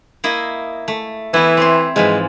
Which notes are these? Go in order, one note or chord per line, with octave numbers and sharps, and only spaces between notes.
A#3 E4 D#5
A3
E3 B3 E4
C4 C#5 C6
G#2 E3 F3 G#3